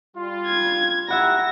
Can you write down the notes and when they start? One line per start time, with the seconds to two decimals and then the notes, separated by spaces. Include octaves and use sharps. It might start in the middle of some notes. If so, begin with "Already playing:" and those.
0.16 G3 F4
0.47 G#6
1.08 E4 G4 A#4 E5 F#5 B5 A#6